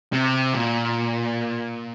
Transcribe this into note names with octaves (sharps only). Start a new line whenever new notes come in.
C3
A#2